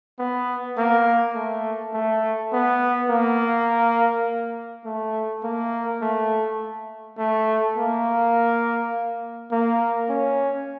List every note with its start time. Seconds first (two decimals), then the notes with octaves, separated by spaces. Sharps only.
0.19 B3
0.77 A#3
1.35 A3
1.94 A3
2.52 B3
3.10 A#3
4.85 A3
5.44 A#3
6.01 A3
7.18 A3
7.77 A#3
9.52 A#3
10.09 C#4